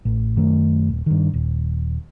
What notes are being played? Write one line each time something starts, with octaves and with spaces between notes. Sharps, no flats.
A1
F#2 D#3 A3
D#1
G2 D#3
D#1